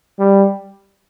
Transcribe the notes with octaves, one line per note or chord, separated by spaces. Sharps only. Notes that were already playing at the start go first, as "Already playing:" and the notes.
G3